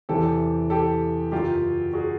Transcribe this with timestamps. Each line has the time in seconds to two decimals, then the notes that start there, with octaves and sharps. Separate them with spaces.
0.09 E2 C3 E3 G4 A4
0.70 G4 A4
1.32 F#2 C#3 F#3 F4 G4
1.93 F#4 G#4